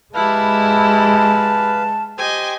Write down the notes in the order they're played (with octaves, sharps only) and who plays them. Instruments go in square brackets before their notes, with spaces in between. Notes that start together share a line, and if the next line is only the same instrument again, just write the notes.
[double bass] G#3 [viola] E4 G4 [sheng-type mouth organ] B4 F5 [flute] A5
[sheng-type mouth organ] G4 C5 G5 [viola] D#5 G#5